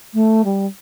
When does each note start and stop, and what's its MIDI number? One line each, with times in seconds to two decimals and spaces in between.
0.14 0.42 57
0.45 0.66 55